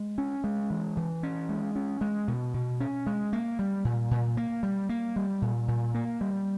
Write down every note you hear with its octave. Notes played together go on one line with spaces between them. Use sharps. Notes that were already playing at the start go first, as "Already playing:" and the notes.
Already playing: G#3
C#4
G#3
E3
E3
C#4
G#3
C#4
G#3
B2
B2
C#4
G#3
A#3
G3
A#2
A#2
A#3
G3
A#3
G3
A#2
A#2
A#3
G3